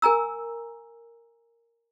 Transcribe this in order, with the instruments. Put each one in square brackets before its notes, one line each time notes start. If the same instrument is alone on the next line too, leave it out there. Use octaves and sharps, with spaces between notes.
[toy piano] A#4 G#5 A#5 E6